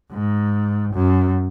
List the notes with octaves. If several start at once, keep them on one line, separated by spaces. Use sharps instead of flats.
G#2
F#2